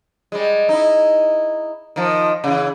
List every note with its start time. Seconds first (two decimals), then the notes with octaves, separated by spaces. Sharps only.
0.32 G3 G#3
0.69 D#4 E4
1.96 D#3 F3
2.44 C#3 E3